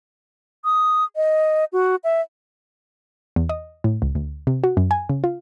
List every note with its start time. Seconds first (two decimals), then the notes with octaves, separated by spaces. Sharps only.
0.65 D#6
1.16 D#5
1.73 F#4
2.04 E5
3.36 E2
3.49 D#5
3.84 A2
4.02 C#2
4.15 D2
4.47 C3
4.64 F#4
4.77 F#2
4.91 G#5
5.09 C#3
5.24 F4